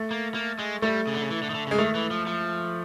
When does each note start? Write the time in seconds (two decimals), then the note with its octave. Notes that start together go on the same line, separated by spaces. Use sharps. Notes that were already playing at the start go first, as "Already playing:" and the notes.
Already playing: A3
0.11 A#3
0.34 A#3
0.59 G#3
0.82 G3 A3
1.07 C#3
1.14 D3
1.22 C#3
1.31 E3
1.43 D3
1.50 D#3
1.54 D3
1.67 C#3
1.71 G#3
1.79 D#3 A3
1.95 E3
2.11 F3
2.27 F3